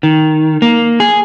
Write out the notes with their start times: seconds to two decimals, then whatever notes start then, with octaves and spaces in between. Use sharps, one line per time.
0.03 D#3
0.62 A#3
1.00 G#4